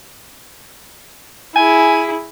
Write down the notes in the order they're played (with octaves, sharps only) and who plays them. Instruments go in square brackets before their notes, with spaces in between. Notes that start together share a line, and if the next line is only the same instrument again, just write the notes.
[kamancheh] E4 G#4 [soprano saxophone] G#5